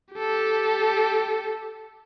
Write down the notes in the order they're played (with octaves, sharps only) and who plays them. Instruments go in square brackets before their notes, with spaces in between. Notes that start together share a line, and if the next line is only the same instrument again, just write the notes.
[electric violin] G4 A4